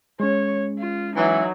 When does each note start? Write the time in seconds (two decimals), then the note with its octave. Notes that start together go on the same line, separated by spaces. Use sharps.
0.20 G#3 C#4 C#5
0.79 F4
1.16 E3 F#3 D#4